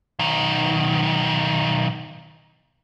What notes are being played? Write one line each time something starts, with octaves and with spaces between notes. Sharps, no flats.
B1 D#3